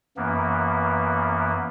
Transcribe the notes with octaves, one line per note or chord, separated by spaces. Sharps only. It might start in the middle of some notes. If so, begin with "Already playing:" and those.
F#2 E3 A#3 B3